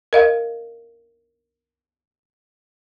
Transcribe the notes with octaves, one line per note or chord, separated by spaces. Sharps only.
A#4 D#5 F5